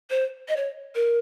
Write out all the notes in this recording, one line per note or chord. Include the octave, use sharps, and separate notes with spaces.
C5
D#5
C#5
A#4